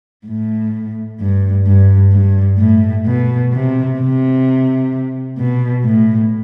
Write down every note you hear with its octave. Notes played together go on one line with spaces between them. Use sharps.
A2
G2
G2
G2
A2
B2
C3
C3
B2
A2